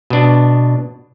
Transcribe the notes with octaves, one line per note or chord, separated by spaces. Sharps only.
B2 D4